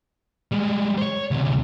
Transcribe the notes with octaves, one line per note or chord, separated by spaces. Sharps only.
G3 G#3
C5 C#5
D2 C3